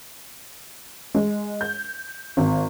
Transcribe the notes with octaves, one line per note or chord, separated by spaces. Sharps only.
G#3
G6
G#1